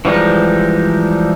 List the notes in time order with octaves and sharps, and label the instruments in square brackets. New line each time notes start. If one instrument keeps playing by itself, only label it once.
[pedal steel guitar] E3 F3 G3 G#3 D#4